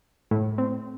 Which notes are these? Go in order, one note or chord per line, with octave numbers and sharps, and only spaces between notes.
A2
C4